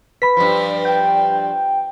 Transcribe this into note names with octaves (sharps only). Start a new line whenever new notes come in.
B4 B5 B6
G2 F3
G5